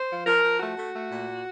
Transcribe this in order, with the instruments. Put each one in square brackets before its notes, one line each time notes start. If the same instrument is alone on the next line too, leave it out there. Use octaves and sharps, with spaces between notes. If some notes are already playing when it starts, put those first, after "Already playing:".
Already playing: [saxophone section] C5
F3
F3 A#4
F3
A3 F#4
A3
A3
A#2